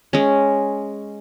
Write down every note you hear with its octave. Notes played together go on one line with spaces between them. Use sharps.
G#3 C#4